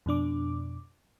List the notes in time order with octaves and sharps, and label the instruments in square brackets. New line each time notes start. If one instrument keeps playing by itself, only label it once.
[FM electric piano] F2 B2 D4 D6